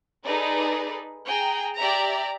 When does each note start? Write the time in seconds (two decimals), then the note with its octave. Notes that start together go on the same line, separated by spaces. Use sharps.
0.24 D#4 G#4 A4 B4 D5
1.26 G#4 G5 A#5
1.76 G4 D5 E5 A#5